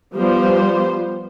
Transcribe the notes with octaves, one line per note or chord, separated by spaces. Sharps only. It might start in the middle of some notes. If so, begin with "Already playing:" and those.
F3 G3 B3 C5